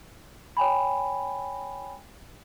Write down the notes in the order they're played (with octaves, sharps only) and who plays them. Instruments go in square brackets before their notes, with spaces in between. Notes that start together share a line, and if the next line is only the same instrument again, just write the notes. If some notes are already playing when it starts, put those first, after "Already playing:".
[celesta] C#5 G5 G#5 B5